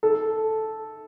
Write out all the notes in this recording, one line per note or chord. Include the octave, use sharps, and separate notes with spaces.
A4